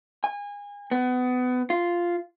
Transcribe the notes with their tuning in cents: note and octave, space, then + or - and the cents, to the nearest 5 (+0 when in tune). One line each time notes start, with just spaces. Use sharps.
G#5 -30
B3 +25
F4 -5